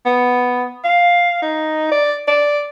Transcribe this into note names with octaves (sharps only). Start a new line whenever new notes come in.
B3
F5
D#4
D5
D5